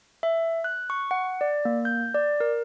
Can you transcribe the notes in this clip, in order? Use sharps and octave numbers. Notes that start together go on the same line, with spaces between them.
E5
F#6
C#6
F#5
D5
A#3
G6
D5
A#4